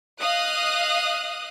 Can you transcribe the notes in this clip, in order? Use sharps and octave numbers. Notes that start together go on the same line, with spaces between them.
D#5 F5 D#6 F#6